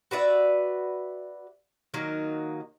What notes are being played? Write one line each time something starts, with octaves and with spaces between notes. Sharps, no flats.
F#4 B4 D5 E5
D#3 F#3 A#3 D#4